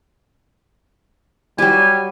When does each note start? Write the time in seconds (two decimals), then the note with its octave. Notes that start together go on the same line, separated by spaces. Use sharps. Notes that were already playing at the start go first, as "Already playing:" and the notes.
1.58 F#3 G3 G4 G#5